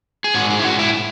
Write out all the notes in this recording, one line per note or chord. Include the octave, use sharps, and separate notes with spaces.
G#4
G#2 F#4
G#4
E4
G#2 F#4
E4